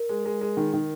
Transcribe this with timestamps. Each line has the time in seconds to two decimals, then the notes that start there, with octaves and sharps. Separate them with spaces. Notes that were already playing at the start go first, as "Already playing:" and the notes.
Already playing: A#4
0.09 G#3
0.26 G#3
0.41 G#3
0.57 D#3
0.73 D#3